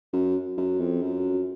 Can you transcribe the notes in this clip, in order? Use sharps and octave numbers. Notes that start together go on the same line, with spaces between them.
F#2
F#2
F2
F#2